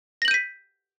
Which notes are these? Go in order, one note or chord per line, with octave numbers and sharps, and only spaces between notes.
G6 A#6 B6 D#7 F#7